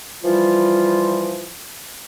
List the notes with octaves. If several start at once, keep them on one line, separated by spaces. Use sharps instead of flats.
E3 F3 G3 F4